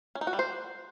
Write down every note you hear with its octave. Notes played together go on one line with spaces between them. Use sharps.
C#4
D#4
F#4
G3
C5